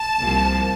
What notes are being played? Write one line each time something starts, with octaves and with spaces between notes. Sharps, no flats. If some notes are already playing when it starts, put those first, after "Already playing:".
Already playing: A5
C2 C3 F3 A#3